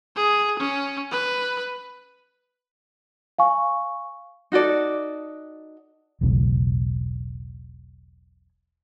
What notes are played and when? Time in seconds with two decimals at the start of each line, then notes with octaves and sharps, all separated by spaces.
0.16 G#4
0.59 C#4
1.11 B4
3.39 F5 G#5 C#6
4.52 D#4 F#4 A4 D5
6.21 E1 B1 A2 C#3